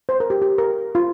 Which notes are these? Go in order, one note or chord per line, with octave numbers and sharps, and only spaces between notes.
C5
A#4
G4
G4
A#4
F4